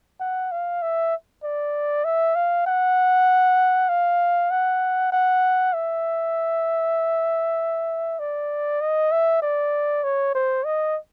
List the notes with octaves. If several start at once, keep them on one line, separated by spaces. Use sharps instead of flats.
F#5
F5
E5
D5
E5
F5
F#5
F5
F#5
F#5
E5
D5
D#5
E5
D5
C#5
C5
D#5